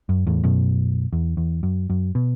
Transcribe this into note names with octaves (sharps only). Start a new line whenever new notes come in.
F#2
E2 A2
F#2 B2
E2
E2
F#2
F#2
B2